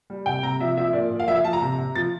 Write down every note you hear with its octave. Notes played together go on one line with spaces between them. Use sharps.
G3
C3 G5
C3 A#5
F3 E5
F3 E5
A#2 D5
A#2
F5
F3 E5
F5
F3 A5
A#5
C3
C3
F3 A6